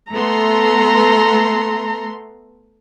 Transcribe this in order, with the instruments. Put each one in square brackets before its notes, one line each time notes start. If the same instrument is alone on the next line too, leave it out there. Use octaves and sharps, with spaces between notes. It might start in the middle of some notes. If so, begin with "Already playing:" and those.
[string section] A3 B3 C6 [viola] A4 A#5